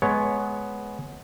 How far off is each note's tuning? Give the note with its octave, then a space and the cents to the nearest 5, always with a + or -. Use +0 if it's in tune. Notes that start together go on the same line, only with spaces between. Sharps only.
G#3 +25 B3 +0 C#5 +0